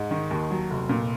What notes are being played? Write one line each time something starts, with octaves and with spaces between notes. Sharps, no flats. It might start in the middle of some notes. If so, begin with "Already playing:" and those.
Already playing: G#2
D#3
D#2
F#3
F1
A#2